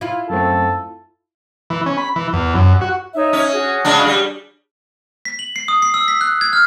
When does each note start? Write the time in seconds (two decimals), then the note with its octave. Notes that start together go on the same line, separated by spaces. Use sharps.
0.01 E4 F4
0.30 F#2 A3 C4 A4
1.70 E3
1.86 C#4
1.98 B5
2.16 E3
2.33 E2
2.55 F#2
2.81 F#4
3.15 D#4 C#5 E5
3.33 C#4
3.53 F#4 G#4
3.85 C#3 G#3 D4
4.06 G3
5.25 B6
5.39 F#7
5.56 C7
5.68 D#6
5.82 C7
5.94 E6
6.08 B6
6.21 F#6
6.41 G#6
6.53 F6